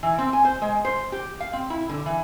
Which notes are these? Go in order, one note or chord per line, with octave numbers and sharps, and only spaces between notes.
E3
C4
G#5
C5
G#3
C5
G4
F5
C4
E4
D3
E3